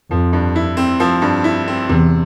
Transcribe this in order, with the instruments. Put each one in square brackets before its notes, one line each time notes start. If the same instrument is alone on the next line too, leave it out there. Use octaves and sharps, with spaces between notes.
[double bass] F2 [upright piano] F3
[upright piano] G2
E4
C4
F3
G2
E4
C4
[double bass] E2 [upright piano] C3